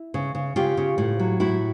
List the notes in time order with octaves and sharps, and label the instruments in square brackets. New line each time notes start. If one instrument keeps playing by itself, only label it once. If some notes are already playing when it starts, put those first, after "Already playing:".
Already playing: [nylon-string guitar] E4
C#3
C#3
C#3 F4 G4
C#3
A2
F#3
A2 E4 F#4